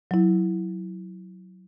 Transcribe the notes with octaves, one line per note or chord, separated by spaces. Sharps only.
F#3 E4